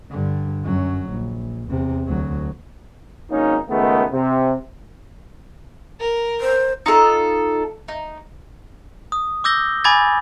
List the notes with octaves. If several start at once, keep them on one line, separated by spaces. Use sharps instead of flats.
G2 D3
F#2 F#3
A#1
E2 C3
D2 F#3
G#1 A#3 C#4 D#4
C#2 D#3 G#3 A3 B3
C3
A#4
C5
D#4 F4 A4
D#4
D#6
D6 E6 G6 A#6 G7
G#5 B5 D6 G#6 A6